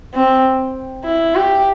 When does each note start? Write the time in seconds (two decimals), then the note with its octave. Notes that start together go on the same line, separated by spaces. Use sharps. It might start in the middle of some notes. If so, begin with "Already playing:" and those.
0.14 C4
1.05 E4
1.35 G4